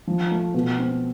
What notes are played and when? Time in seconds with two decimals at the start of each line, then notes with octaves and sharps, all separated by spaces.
0.07 F3
0.31 A3
0.54 B2
0.79 C4